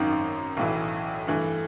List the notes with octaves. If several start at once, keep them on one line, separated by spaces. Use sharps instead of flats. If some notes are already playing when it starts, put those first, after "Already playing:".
Already playing: G#1 F#2 D#3
B1 A2 E3
G2 E3 A3